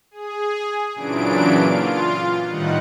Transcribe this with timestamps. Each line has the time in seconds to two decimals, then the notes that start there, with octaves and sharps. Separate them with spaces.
0.11 G#4
0.95 A#2 C#3 E3 F#3 D4 D7
1.56 F4
2.47 A2 D#3 G3 D#4 F#5